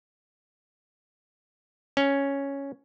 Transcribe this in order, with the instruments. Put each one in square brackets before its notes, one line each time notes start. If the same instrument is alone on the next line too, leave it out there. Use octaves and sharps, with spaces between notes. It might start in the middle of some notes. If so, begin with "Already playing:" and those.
[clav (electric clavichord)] C#4